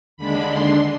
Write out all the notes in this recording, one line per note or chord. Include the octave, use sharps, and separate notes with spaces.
D#2 D3 G#3 D4 B5
C6